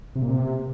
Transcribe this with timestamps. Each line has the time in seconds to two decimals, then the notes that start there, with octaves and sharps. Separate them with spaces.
0.15 C3
0.22 A#2
0.28 C3